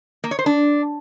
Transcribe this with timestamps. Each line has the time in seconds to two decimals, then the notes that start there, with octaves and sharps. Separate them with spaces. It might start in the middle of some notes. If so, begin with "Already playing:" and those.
0.24 A#3
0.31 C#5
0.39 C5
0.46 D4